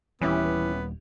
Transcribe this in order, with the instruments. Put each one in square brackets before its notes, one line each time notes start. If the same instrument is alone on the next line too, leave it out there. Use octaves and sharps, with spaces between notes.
[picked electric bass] D#1 G3 [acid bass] E3 [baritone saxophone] B3 [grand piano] C#4 E4 G4